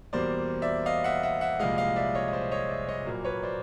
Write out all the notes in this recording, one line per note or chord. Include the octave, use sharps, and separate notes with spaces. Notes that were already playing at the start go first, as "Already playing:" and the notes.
E2 B2 G3 A#3 C5 D5
D5 E5
D#5 F5
E5 F#5
E5 F#5
E5 F#5
C2 A#2 F3 G#3 D#5 F5
D#5 F5
D5 E5
C#5 D#5
D#5
C5 D5
C#5 D#5
D5 E5
C#5 D#5
A#1 A#2 F#3 A#3
B4 C#5
C5 D5